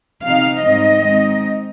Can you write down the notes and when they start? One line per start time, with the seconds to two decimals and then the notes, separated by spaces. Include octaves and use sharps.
0.24 C3 F3 C4 D#4 F5
0.64 G#2 D#3 G3 C4 D#4 D#5
1.04 D#3 G#3 C4 D#4